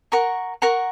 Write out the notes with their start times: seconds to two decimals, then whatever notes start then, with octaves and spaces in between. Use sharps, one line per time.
0.12 A#4 F#5 A#5 C#6
0.62 A#4 F#5 A#5 C#6